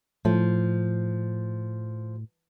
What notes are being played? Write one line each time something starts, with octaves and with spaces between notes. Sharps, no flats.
A2 F3